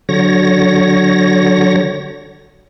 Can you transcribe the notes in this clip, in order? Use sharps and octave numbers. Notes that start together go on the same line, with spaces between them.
D3 F#3 C#5 A#6